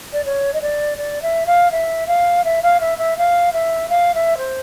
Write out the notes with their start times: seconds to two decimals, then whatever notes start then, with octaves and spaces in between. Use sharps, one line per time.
0.13 D5
0.25 C#5
0.54 D#5
0.62 D5
0.98 D5
1.22 E5
1.46 F5
1.71 E5
2.07 F5
2.44 E5
2.63 F5
2.80 E5
2.98 E5
3.18 F5
3.53 E5
3.89 F5
4.15 E5
4.38 C5